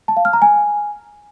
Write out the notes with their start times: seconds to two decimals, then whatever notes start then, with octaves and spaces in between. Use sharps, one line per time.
0.08 A5
0.17 F5
0.25 F6
0.33 A#5
0.42 G#5